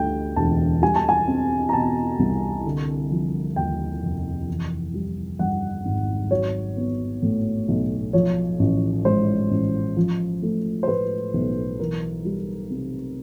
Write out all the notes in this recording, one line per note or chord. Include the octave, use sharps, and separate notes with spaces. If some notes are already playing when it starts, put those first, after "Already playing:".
Already playing: D2 D3 G3 G5
E1 A5
G3 G#5
A5
G#5
C4
A#5
B2 A5
C2
D3
F3
D#2 G5
F1
E3
G3
G2 F#5
G#1
F#3 C#5
B3
A2
B1
F3 C#5
A1
G#2 C5
A1
F3
A3
C5
A2 B4
B1
E3 A#4
G3
C3